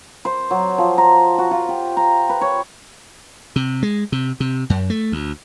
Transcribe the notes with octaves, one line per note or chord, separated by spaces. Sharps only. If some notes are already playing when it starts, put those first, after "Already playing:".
C5
F#3
F3
A#5
F#4
F4
G4
A#5
B4
C#5
C3
G#3
C3
C3
F#2
A3
D2